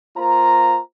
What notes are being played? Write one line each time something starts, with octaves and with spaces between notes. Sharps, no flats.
A#3 F4 C5 A#5